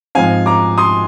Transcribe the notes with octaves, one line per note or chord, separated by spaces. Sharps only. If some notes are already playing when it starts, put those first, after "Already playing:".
G#2 F3 G#3 C4 F5 G#5
A#5 D6
C6 D#6